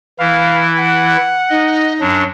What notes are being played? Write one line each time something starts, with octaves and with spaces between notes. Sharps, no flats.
E3 E4 F5
F#5
D#4 D#5
F#2 F#3 D4